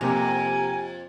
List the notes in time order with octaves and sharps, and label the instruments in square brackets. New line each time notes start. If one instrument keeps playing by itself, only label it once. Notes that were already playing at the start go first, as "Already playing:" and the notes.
[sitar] F2 [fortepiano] C3 A#3 [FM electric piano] G4 A#5 [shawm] G#5